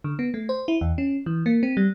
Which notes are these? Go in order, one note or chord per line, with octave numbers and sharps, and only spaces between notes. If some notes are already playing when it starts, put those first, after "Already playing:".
D3
B3
A3
C5
E4
E2
C#4
E3
A#3
C4
G3